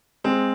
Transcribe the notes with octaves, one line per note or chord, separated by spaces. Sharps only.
G#3 C4